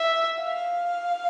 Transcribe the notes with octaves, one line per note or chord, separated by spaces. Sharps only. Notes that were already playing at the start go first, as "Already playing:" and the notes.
Already playing: E5
F5